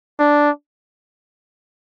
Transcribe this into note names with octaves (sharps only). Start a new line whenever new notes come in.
D4